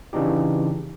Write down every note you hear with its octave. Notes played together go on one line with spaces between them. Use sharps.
C#3 E3 D4 D#4 G4